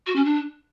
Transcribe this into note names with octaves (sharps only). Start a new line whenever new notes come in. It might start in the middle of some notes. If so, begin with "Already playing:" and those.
F#4
C#4
D4